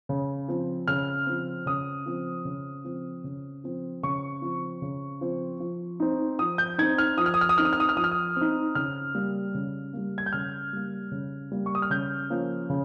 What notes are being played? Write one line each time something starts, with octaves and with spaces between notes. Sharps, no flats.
C#3
F3 C4
C#3 F6
F3 C4
C#3 D#6
F3 C4
C#3
F3 C4
C#3
F3 C4
C#3 C#6
F3 C4
C#3
F3 C4
F3
C4 D#4
F3 D#6
G6
C4 D#4 G#6
F6
F3 D#6
F6
D#6
F6
D#6
C4 D#4 F6
D#6
F6
D#6
F6
F3 D#6
F6
D#6
C4 D#4
C#3 F6
G3 A#3
C#3
G3 A#3
G#6
G6
C#3 F6
G3 A#3
C#3
G3 A#3
C#6
D#6
F6
C#3 G6
F3 A#3 C#4
C#3